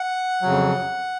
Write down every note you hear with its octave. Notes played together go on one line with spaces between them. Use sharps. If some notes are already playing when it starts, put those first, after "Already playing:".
Already playing: F#5
F2 C#3 F#3